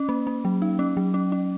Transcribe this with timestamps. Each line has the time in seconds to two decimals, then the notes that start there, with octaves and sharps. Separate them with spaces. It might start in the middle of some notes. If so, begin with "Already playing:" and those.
Already playing: C#4
0.09 A#3
0.27 A#3
0.45 F#3
0.62 D#4
0.79 C#4
0.97 F#3
1.14 C#4
1.32 C#4